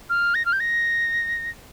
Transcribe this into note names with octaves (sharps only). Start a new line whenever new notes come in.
F6
A#6
F6
G6
A#6